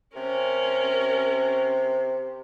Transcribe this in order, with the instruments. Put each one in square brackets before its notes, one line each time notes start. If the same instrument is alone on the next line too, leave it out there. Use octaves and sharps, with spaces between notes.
[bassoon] C3 [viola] C#4 A#4